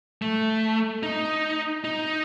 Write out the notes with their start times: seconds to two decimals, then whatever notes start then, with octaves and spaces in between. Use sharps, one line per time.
0.22 A3
1.03 D#4
1.84 D#4